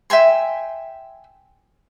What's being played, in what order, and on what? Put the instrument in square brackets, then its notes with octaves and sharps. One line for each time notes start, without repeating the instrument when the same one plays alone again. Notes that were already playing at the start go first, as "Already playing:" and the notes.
[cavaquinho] E5 G5 G#5 C6